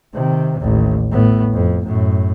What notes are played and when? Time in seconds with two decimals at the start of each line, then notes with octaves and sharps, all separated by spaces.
0.14 C3 D#3
0.60 A1 D#2
1.11 A2 B3
1.53 F2
1.83 F#2 A2